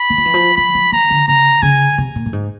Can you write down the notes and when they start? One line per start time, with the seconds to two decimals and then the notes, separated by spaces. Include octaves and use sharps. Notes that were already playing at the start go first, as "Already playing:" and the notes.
Already playing: B5
0.10 E3
0.18 F3
0.25 E3
0.34 F3
0.56 F3 B5
0.75 F3
0.92 E3 A#5
1.10 D3
1.28 C#3 A#5
1.62 C#3 G#5
1.98 C3
2.16 A#2
2.26 A2
2.33 G#2